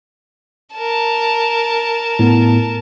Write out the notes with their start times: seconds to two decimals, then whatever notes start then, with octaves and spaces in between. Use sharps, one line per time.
0.74 A#4 A5
2.19 A2 B3